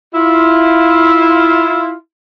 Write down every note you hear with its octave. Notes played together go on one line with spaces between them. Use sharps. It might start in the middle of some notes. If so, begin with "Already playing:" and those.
E4 F4